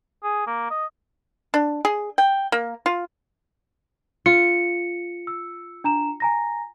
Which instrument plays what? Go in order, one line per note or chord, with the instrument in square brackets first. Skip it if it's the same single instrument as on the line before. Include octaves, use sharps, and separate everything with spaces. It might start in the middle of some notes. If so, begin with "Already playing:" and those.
[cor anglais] G#4
A#3
D#5
[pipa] D4
G#4
G5
A#3
F4
[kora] F4 [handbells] C#7
[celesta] E6
D4 A#5 E7
G#5 A#5 A#6